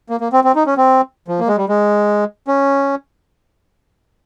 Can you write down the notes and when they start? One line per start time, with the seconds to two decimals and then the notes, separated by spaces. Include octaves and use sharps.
0.09 A#3
0.20 A#3
0.33 C4
0.44 C4
0.55 D#4
0.66 C#4
0.77 C4
1.28 F3
1.39 A#3
1.48 G#3
1.57 G3
1.69 G#3
2.48 C#4